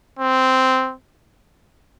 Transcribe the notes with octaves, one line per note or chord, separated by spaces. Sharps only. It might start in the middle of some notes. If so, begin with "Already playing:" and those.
C4